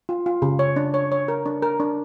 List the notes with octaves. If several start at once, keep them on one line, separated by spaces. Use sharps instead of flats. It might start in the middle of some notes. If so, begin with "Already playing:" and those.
F4
F4
C#3
C#5
D4
C#5
C#5
A#4
D4
A#4
D4